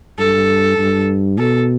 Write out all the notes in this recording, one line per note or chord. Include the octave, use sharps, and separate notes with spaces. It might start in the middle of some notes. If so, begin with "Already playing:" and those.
G2 A4
G2
B2 A4